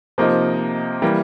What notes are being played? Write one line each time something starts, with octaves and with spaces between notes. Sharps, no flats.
C3 F3 A#3 D#4
E3 G3 A#3